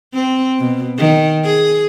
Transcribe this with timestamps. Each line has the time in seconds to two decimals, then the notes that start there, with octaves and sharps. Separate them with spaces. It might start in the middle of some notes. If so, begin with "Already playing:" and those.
0.14 C4
0.59 B2
0.98 D#3
1.44 G#4